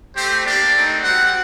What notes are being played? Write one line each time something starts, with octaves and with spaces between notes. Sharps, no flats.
A3 C4 G4 C5
A#3 D4 G4 D5
A3 C4 D#4
G3 C4 F#4 F#5